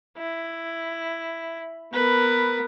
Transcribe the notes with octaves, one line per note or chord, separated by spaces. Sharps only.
E4
B3 A#4 B4